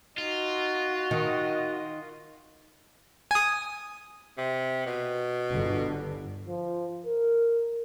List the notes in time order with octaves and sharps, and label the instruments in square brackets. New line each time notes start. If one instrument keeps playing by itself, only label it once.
[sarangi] D#4 [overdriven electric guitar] F4 [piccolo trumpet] F#4
[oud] D#3 [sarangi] D#5
[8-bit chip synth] G#5 D#6
[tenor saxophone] C3
B2
[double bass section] G1 D3
[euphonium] F3
A#4